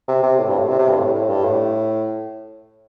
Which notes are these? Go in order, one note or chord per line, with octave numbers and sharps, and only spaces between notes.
C3
C3
A2
G2
A2
C3
C3
G2
A2
A2
G2
A2